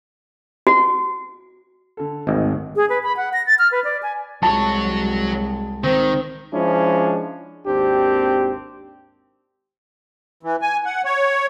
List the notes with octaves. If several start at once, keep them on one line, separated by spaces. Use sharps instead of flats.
F#4
D3 A4
G#1 D2 D#4 D#5
G#4
B4
B5
F#5
A#6
A6
F6
B4
D5
G#5
C2 F#3 G#3 C#5 A5
D#3 C4
F3 G#3 C#4 D4 E4
G#1 D#2 C4 D4 G4
E3
G#5
F#5
C#5